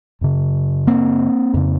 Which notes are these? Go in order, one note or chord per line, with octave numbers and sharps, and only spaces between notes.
F#2 C#3
A#3 C4
F2 C#3